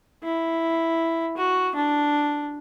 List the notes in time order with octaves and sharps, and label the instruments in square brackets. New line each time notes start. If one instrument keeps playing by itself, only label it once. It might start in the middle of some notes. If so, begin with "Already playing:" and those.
[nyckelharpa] E4
F#4
D4